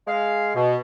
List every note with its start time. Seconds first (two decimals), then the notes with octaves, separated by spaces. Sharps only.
0.07 G#3 F5
0.55 B2